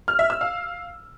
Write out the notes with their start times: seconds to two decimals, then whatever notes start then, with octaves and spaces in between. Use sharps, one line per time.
0.08 F6
0.19 E5
0.30 E6
0.41 F5